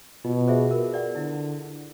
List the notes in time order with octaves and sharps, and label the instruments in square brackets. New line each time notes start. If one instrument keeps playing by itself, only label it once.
[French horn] B2 [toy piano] F4
[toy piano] G#4 C5 E5
A#4
D5 F#5
[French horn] D3 [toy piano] E4